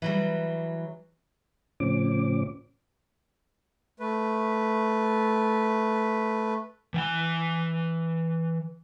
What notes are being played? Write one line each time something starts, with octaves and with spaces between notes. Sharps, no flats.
E3 F#3 G3
A2 C#3 F3 C4 C#4 D6
A3 B4
E3 G5 G#5